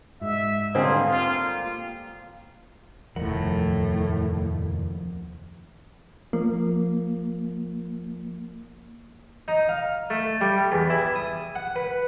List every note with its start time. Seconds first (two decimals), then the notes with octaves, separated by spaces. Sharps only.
0.21 G#2 E5
0.75 A#2 D3 G3 C4 G#4
1.04 F4
3.16 F1 D#2 A2 F3 A#4 F#5
6.33 F3 A#3
9.48 D#4
9.69 F5
10.10 A3
10.41 G3
10.72 E2
10.90 E4
11.15 D#6
11.55 F#5
11.76 B4